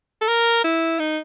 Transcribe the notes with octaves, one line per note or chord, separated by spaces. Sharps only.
A4
A#4
E4
D#4